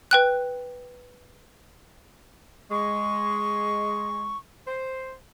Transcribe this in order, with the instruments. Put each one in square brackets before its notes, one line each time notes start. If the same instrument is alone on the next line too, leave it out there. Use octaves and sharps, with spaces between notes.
[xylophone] B4 G5 F#6
[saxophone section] G#3 [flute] C#6
[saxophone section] C5